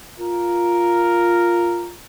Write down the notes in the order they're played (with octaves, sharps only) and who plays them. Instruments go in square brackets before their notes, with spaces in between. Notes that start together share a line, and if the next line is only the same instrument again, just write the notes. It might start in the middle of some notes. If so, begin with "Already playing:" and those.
[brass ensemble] F4 A#4